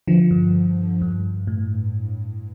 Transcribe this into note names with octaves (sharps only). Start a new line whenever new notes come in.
D3 F3
G2
G2
A2